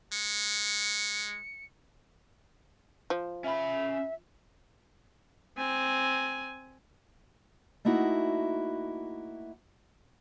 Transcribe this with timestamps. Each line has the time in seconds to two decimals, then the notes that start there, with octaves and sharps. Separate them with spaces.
0.12 G#3 C#7
3.10 F3
3.44 C#4 E5 B5
5.58 C4 G#5
7.85 A3 A#3 D#4 E4 F#4